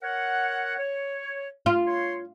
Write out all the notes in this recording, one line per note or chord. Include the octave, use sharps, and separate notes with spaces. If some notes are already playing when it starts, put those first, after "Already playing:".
A#4 C#5 F#5
C#5
F4
C#5 C6